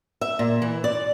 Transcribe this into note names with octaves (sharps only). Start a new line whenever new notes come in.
E5
A#2
E3
D5